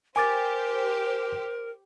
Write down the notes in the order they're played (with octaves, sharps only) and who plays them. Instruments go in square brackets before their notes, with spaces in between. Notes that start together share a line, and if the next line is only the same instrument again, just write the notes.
[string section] G4 C5 [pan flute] A#4 [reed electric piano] G#5 D6 A6